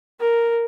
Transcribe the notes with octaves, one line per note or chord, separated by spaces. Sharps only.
A#4